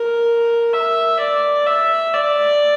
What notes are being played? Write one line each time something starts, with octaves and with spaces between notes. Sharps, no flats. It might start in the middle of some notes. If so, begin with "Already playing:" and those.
Already playing: A#4
E5
D5
E5
D5